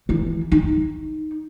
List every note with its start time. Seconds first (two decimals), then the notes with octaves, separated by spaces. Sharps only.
0.09 E3 E4
0.52 D#4